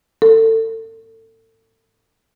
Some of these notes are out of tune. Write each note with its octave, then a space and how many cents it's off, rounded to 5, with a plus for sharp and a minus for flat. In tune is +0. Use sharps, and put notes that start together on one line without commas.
A4 +30